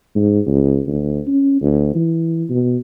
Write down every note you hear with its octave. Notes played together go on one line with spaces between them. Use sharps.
G#2
C#2
D2
C#4
D2
E3
B2